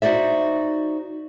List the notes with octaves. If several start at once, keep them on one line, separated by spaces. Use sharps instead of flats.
D#4 F#4 C5 D5 E5